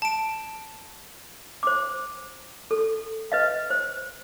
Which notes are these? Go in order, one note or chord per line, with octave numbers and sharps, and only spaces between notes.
A5 D7
C5 D6
A4
B4 D#5 F5
C5